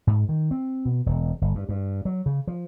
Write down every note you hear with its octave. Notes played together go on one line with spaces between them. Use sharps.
G#2
D#3
C4
B2
E1
G1
G2
G2
F#3
C#3
F3